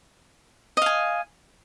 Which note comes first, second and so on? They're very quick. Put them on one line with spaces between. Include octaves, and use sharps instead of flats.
D#5 F5 G#5